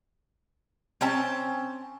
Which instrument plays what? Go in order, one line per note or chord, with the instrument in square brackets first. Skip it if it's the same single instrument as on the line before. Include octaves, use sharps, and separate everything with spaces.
[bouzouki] C4 C#4 G5 A5